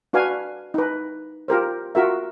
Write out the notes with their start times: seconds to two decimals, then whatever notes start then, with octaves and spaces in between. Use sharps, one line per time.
0.13 D4 F#4 B4 F5 G#5
0.74 D#4 B4
1.48 F4 G4 A#4 C5
1.95 F4 F#4 A#4 E5